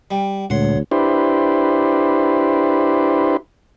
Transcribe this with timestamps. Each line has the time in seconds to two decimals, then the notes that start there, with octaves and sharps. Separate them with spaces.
0.11 G3 G5
0.50 D2 A#2 G#3 C#5 F#5 C6
0.91 D4 E4 G4 B4 C5